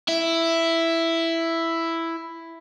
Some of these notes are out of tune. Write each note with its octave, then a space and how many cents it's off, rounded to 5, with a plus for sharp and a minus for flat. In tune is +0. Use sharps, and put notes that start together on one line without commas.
E4 +5